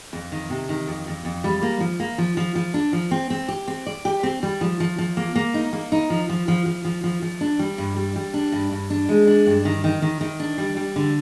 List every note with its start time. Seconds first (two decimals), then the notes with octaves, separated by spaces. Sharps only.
0.13 F2
0.32 D#3
0.50 C3
0.69 D#3
0.87 F2
1.07 F2
1.25 F2
1.44 G3
1.62 A#3
1.80 F3
2.00 A#3
2.18 F3
2.37 F3
2.55 F3
2.74 D4
2.93 F3
3.11 C4
3.30 C4
3.48 G4
3.68 C4
3.86 D5
4.05 G4
4.23 C4
4.43 G3
4.61 F3
4.80 F3
4.98 F3
5.17 A#3
5.36 A#3
5.54 D#4
5.73 A#3
5.92 D#4
6.10 F3
6.29 F3
6.48 F3
6.66 F3
6.85 F3
7.04 F3
7.22 F3
7.41 D4
7.59 G3
7.78 G2
7.97 G3
8.16 G3
8.34 D4
8.52 G2
8.71 G2
8.90 D4
9.09 G#3
9.27 D4
9.46 G2
9.65 D#3
9.84 D#3
10.02 D#3
10.21 D#3
10.40 D4
10.58 G3
10.77 G3
10.96 D3